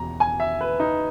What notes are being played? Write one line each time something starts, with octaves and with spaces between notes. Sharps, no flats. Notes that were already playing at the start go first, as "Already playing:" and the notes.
Already playing: E1 E2 B2 A#5
G#5
E5
B4
D#4